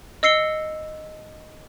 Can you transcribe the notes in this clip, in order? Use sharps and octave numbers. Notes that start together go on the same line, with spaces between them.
D#5 E6 C7 C#7 G7